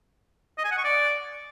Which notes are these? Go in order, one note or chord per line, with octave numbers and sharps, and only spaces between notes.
D#5
G#5
F#5
C#6
D5